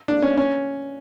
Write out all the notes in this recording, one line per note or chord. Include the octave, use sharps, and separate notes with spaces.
D4
C#4
C#4